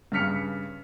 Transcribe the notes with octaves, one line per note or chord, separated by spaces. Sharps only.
G2 C#3 F6 B6 C#7 F7